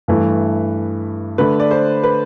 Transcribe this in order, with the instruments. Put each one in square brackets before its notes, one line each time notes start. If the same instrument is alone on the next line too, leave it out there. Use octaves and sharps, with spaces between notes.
[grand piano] G2 E3 A3
[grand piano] D3 A3 D4 [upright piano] B4
[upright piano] D5
C5
B4